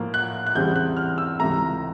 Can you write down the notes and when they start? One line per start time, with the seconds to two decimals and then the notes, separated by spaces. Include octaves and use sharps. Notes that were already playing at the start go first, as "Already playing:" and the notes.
Already playing: A2 F3 A#3
0.14 F#6
0.46 F#6
0.55 E2 C#3 E3 G3 C4 G6
0.76 F#6
0.97 F6
1.18 E6
1.39 C#2 C3 E3 A3 A#5